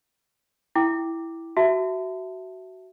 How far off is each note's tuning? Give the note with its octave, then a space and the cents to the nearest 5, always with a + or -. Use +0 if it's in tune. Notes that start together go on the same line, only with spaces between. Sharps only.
E4 +0 G5 +0 D6 +0
F#4 +20 E5 +0 A5 +15